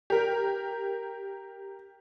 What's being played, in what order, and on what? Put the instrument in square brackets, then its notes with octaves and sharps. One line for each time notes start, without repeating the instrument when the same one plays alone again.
[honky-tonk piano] G4 A#4